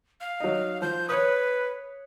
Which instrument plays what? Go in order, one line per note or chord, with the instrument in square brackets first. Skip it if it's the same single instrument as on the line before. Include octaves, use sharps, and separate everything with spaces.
[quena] F5
[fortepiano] F#3 D#4
[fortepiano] F3 [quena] G6
[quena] B4 [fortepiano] C#5 D#6